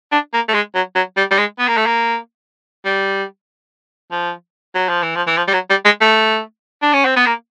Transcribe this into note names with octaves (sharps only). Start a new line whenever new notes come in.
D4
A#3
A3
G#3
F#3
F#3
G3
G3
G#3
B3
A#3
A3
A#3
G3
F3
F#3
F3
E3
F3
E3
F3
G3
F#3
G3
G#3
A3
D4
C#4
C4
B3
A#3